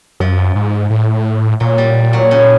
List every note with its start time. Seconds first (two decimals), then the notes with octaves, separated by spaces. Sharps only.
0.20 F#2 F3
0.55 G#2
0.90 A2
1.60 A#2 F#3
1.78 G3
2.13 F#3
2.31 C#3